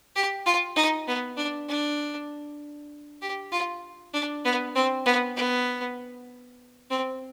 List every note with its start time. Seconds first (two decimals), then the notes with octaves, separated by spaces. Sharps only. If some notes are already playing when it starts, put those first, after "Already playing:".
0.15 G4
0.46 F4
0.76 D#4
1.07 B3
1.37 D4
1.69 D4
3.21 G4
3.52 F4
4.14 D4
4.45 B3
4.75 C4
5.06 B3
5.36 B3
6.90 C4